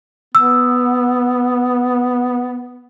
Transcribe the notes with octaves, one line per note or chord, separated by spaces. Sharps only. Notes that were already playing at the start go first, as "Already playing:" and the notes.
B3 E6